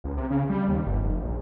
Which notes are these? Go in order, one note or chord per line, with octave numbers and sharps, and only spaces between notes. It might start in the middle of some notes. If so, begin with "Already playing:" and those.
C#2
C3
C#3
G3
D#2
G1
F1
A#1